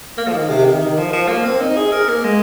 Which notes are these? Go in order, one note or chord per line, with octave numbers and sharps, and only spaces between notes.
A#3
F3
D#3
C3
D#3
D#3
F3
F3
A#3
C4
D#4
G#4
A#4
A#3
G#3